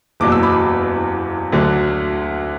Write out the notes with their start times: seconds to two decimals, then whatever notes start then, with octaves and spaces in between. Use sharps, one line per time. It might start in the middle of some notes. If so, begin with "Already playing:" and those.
0.20 F#1 E2 B2 F#3 D6
0.32 E6
0.43 B5 D6
1.53 D2 D3 F#3